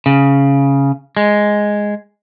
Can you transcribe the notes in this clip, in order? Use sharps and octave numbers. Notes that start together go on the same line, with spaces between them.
C#3
G#3